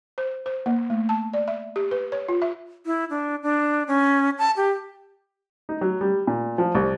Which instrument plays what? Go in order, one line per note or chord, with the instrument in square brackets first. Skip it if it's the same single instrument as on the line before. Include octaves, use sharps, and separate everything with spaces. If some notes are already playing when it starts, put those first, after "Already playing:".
[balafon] C5
C5
A#3
A3
A5
D5
E5
G4
B4
C#5
F4
E5
[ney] E4
D4
D4
C#4
A5
G4
[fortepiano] D#4
F#3
G3
A#2
F3
C2